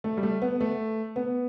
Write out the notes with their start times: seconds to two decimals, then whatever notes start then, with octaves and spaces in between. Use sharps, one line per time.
0.04 A3
0.17 G3
0.23 A3
0.42 B3
0.61 A3
1.16 B3